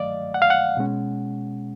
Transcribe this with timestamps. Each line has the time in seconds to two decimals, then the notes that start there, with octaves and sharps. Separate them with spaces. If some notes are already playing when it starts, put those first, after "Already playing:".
Already playing: G2 D#3 F#3 A3 D5 D#5 F5
0.34 F#5
0.42 F5
0.50 F#5
0.77 B2 G#3 C#4